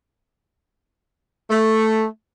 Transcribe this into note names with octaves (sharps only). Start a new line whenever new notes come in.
A3